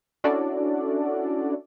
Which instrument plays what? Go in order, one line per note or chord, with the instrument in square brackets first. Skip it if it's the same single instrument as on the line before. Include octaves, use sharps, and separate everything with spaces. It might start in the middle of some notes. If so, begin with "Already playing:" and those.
[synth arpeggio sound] C#4 D4 E4 F#4 A4 D5